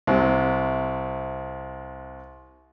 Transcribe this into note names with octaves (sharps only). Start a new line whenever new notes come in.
C2 C3